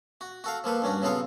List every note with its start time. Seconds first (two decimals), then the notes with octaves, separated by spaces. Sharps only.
0.21 F#4
0.44 F#4 A4 F5
0.64 F3 A#3 A4 B4
0.82 G2 C#4 D4 F#4
1.02 C#3 F#3 B3 F4 A4 F5